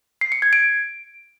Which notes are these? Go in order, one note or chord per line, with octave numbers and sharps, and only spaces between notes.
C7
C#7
G#6
D7